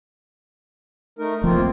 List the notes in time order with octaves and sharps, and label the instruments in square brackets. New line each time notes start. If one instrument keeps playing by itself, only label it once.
[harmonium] A3 D#4 A#4
[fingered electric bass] E1 F3 A3 [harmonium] A#3 C4 F4